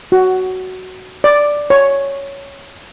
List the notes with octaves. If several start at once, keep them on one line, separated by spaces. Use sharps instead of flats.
F#4
D5
C#5